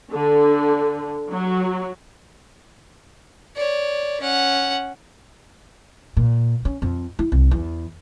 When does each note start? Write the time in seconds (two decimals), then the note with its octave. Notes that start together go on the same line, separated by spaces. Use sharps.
0.13 D3
1.32 F#3
3.56 C#5 D5
4.21 C#4 F#5
6.17 A#2
6.65 C#4
6.82 F2
7.19 E4
7.32 C2
7.51 E2